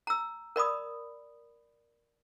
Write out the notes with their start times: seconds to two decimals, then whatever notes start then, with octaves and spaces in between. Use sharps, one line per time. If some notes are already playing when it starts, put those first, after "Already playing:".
0.07 A#5 E6
0.56 A#4 D5 B5 D#6